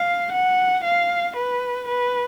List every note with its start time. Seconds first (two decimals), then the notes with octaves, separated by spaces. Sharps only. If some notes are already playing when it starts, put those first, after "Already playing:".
Already playing: F5
0.33 F#5
0.84 F5
1.36 B4
1.88 B4